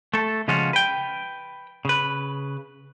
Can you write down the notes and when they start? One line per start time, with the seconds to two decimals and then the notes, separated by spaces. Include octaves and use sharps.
0.14 A3 A4
0.48 C#3 F3 G#3 C#4 F4 F#4
0.73 B4 G5
1.85 C#3 B4